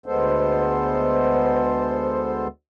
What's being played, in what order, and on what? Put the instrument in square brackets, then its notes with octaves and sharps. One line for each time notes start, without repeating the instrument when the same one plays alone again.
[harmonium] D2 G#3 B3 A4 C5